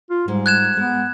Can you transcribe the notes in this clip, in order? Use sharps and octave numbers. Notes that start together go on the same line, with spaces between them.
F4
G#2 G3 G#3
F#6 G#6 E7
G#3 B3